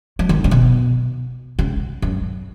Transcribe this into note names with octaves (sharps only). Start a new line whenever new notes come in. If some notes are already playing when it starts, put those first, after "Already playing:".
F#3
D#3
C#3
B2
C#3
F#2